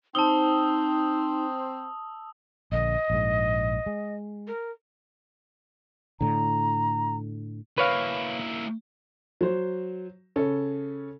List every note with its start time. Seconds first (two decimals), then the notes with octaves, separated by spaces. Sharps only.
0.15 C4 D#4 C5 A5 D#6 E6 G7
2.72 A#1 D3 D#5
3.10 A#1 G#2
3.86 G#3
4.47 A#4
6.21 A2 D3 A#5
7.78 A#3 E4 B4 C#5 F5
9.41 F#3 C5
10.36 C#3 C#4 A4